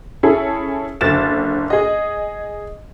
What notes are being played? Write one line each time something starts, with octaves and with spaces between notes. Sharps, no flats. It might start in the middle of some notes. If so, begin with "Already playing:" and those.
C#4 E4 G#4 A4
F#1 D3 A6 E7
G#4 D#5